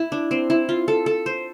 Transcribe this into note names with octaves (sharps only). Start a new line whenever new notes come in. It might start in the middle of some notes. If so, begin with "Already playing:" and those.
Already playing: E4
D4
C4
E4
F4
A4
A4
C5